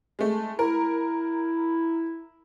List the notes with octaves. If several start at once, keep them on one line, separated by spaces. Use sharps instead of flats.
G#3 A3
E4 A#4